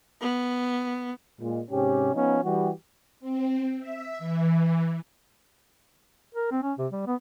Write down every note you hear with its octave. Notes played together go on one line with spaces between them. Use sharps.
B3
A#2 G#3
G#2 C3 C#4 G4
F3 B3 C#4 D#4 F4
E3 G3 F#4 G4
C4
E5
E3
A#4
C4
C#4
C3
G3
B3